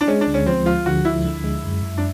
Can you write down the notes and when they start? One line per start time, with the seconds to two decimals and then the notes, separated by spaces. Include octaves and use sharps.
0.01 D4
0.07 G#3 C#4
0.21 D4
0.27 D2
0.34 C#4
0.46 F3 C4
0.66 F3 F4
0.86 D3 F#4
1.05 F3 E4
1.25 D3
1.44 G#3
1.64 F#2
1.83 F#2
1.98 D4